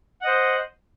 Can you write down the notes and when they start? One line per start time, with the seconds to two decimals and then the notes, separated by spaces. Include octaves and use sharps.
0.21 F#5
0.24 D#5
0.27 C5